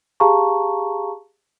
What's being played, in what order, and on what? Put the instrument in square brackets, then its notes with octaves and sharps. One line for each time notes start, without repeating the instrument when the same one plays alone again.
[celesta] G4 G#4 F5 A5 A#5 C#6